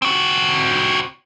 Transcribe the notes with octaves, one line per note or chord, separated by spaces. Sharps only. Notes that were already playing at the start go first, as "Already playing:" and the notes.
C4 F#4